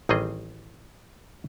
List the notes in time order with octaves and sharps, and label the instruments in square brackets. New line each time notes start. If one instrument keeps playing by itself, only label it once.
[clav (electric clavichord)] A1 D#3 G3 C4 G#4 D#5